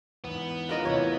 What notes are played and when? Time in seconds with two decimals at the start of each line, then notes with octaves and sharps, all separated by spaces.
0.24 E2 G#2 B3
0.69 F4 A#4 D#5
0.85 E2 A2 C3 C#5